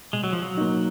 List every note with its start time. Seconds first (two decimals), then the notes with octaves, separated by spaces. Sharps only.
0.13 B2 G#3
0.24 F#3
0.33 F3
0.42 F#3
0.58 A#3 D#4